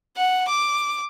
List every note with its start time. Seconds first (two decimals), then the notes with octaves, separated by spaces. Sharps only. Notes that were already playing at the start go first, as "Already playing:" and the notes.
0.17 F#5
0.49 D6